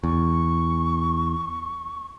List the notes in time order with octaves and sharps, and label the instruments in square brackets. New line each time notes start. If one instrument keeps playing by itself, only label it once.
[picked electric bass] E2 [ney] C#6